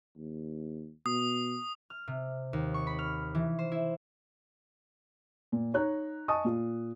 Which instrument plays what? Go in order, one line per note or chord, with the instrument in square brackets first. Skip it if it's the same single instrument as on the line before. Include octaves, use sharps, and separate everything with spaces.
[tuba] D#2
[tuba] B2 [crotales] D#6
[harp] F6
C3
D#2
C#6
B5
F6
E3
C5
E4
[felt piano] A#2
D#4 C#5 A#5 F#6
D#5 G#5 A5 C#6 D#6
A#2 F4